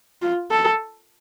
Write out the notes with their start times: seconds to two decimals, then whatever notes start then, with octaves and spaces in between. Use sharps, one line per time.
0.22 F4
0.51 A4